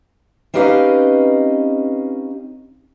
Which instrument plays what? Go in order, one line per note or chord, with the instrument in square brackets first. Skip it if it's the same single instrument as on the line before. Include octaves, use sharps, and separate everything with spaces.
[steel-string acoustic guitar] C4 C#4 D#4 G4 B4 F5